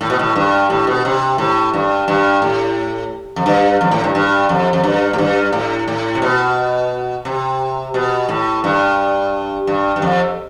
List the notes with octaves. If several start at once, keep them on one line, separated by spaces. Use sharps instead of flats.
A2
B2
A2
G2
A2
B2
C3
A2
G2
G2
A2
F2
G2
F2
A2
G2
G2
F2
F2
G2
A2
G2
A2
A2
C3
B2
C3
B2
A2
G2
G2
G2
F2